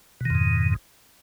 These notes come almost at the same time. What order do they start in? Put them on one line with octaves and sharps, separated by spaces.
B2 D#3 F2 G#2